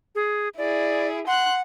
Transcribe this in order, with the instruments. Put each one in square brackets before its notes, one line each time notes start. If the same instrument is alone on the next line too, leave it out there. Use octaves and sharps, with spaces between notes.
[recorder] G#4
[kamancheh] E4 G#4 [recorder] D5
[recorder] F#5 [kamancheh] C6 F#6